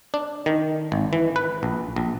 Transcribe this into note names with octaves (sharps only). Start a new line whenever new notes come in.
D4
D#3
G#1
E3
B4
A#1
A#1